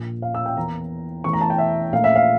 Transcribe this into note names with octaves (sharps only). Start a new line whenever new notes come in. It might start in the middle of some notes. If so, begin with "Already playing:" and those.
Already playing: A#1 A#2 F3
F5
E6
G5
E2 E3 A#3 A#5
E2 E3 A3 C#6
A#5
A5
G5
E5
A#1 A#2 A3 F5
E5
F5